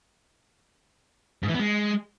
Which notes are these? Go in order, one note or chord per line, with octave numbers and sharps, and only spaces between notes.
G#2
E3
B3
G#3